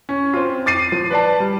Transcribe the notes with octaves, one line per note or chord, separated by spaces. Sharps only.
C#4
C4 F4
D6 A6 C7 D#7
F3
B4 D5 A5
G3